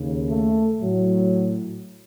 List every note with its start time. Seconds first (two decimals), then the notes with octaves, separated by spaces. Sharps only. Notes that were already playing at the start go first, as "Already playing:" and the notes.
Already playing: D#2 C#3
0.30 A3
0.81 A2 F#3